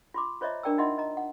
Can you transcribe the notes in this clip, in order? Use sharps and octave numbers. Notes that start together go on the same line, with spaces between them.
F4 C6 D6
F4 C5 C#5 D#5 E5 A#5
D4 A#4 D5 G5 A#5 E6
D#4 F4 D#5 E5 F#5 C6
D#5 A#5
F#5